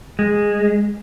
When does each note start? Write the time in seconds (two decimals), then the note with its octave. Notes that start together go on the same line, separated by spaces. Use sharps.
0.19 G#3